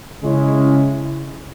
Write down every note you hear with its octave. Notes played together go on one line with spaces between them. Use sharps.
C#3 G#3 C#4 E4